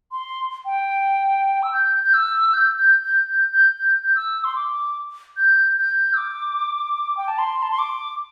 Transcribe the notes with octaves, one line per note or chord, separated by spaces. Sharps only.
C6
G5
E6
G6
G6
E6
G6
G6
G6
G6
G6
G6
G6
E6
C6
D6
G6
G6
E6
D6
G5
A5
C6
A5
C6
D6